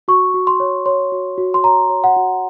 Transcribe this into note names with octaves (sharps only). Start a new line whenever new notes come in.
F#4 C#6
F#4
C6
C#5
C#5 C6
F#4
F#4
C6
C#5 A#5
C#5
F#5
F#4